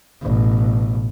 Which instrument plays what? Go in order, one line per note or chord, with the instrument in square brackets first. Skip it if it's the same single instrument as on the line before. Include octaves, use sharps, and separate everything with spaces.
[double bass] A1 B2